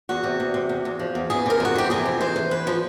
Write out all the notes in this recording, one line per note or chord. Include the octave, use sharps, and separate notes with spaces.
E2 F#4
C3
E2
C3
E2
E2
F3
E2
E3 G#4
C3 A#4
F2 F#4
E3 G4
C3 G#4
F2
E3 C5
E3
E2 B4
F3